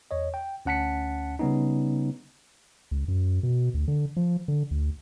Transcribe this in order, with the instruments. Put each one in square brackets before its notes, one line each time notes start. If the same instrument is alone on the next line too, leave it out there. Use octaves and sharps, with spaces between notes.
[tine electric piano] E2 C#5 D#5
G5
D2 C#4 F#5 A5 B6 C#7
C#3 G3 B3 C#4 D#4
[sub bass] C#2
F#2
B2
D2
D3
F3
D3
D2